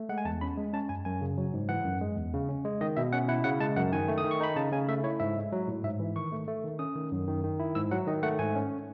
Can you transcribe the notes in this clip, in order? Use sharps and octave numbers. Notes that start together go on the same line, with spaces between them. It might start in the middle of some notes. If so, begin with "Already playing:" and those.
Already playing: A3
G#3 F#5
G#5
E2 A5
C#4 B5
G#3
C#4 A5
F#2 G#5
F#2 G#5
C#3
F#3
G#2
E3 F#5
F#2
G#3
E2
C#3
C#4
G#3
D#3 D#5
B2 E5
C#4 F#5
E4 F#5
C#3 F#5
G#3 A5
F#2 F#5
D#3 G#5
A3
D#6
D#3
C#6
D#4 B5
C#3 A5
C#3 G#5
A3 E5
E4 C#5
G#2 E5
G#3
F#3
A2
G#2 E5
E3
D#3 C#6
A3
A3
D#3
C#4 D#6
D#3
F#2
D#3
D#3
E4
G#2 E6
F#3 F#5
D#3 D#5
A3 F#5
G#2 G#5
C#4